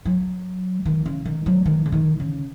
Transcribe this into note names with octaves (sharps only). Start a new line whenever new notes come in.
F#3
D#3
C#3
D#3
F#3
D#3
C#3
D#3
C#3